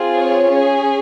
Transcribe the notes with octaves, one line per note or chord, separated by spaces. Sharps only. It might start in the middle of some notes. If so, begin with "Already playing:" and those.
Already playing: C4 F4 G#4
C#5
C#4 G#4